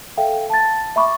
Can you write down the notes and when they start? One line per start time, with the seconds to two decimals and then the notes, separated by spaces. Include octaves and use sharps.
0.17 A4 E5 F5 G5
0.50 A5 A6
0.96 E5 B5 C#6 D6